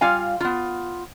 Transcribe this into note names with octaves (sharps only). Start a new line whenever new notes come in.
G3 F4 F5 G#5
B3 F4